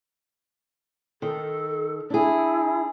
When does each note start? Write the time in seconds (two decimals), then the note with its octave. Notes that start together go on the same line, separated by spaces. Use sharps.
1.22 D#3 A4
2.10 D4 E4 G#4